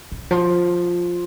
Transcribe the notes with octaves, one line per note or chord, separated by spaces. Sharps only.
C#3
F3